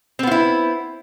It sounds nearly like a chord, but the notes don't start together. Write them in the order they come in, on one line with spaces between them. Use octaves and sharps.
C4 B3 F4 E4